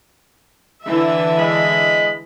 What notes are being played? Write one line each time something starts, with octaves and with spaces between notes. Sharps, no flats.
D3 E3 E5
G#3 D#5 B5